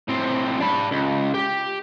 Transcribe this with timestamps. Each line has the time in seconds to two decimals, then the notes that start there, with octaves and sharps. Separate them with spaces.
0.08 A2 C4
0.61 D4 B5
0.91 C#2
1.34 G4